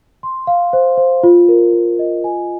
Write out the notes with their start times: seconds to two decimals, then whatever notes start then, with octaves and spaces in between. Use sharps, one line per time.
0.23 C6
0.47 F5
0.73 C5
0.97 C5
1.23 F4
1.48 A#4
1.73 F4
1.99 D#5
2.24 G#5